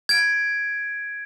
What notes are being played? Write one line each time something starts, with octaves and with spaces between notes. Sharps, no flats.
G#6 D7